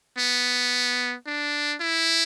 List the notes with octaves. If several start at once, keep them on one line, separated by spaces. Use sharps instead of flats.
B3
D4
E4